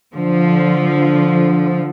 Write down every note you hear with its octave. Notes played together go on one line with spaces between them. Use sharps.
D3 F3